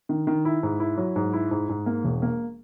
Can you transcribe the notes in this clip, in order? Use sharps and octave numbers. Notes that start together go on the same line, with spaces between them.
D#3
D#3
E4
G#2
E4
F#3
G#2
E4
G#2
G#2
A#3
E1
A#3